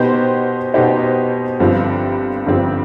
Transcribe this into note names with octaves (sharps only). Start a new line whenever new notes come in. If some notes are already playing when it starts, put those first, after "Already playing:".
Already playing: B2 B3 D#4 G4 C5
B2 B3 D#4 G4 C5
G1 G2 F3 C4 G4
G1 G2 F3 C4 G4